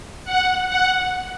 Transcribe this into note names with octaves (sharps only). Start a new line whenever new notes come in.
F#5
F#5